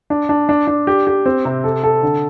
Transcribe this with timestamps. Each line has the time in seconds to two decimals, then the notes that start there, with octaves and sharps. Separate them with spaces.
0.10 D4
0.29 D4
0.49 D4
0.67 D4
0.87 G4
1.07 G4
1.26 C4
1.45 C3
1.64 A4
1.84 A4
2.03 D3